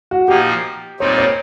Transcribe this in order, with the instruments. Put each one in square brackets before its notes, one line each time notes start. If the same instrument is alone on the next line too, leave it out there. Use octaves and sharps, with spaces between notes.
[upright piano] F#4
[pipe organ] A#2 F3 A#3 D#4 [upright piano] G4
[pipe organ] A#2 G3 C4 D#4 [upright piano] C#5
[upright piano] C#5